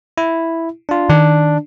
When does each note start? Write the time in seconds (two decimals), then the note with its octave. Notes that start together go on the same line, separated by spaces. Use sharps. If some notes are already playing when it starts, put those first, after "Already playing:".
0.18 E4
0.89 D4 F4
1.09 D#3 D4